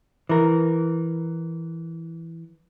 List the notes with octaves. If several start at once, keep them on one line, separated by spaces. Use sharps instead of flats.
E3 A#4